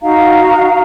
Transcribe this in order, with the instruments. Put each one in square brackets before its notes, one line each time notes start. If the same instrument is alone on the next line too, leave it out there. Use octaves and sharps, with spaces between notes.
[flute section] D#4 F#4 F5 A#5